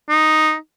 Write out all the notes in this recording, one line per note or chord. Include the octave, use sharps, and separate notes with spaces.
D#4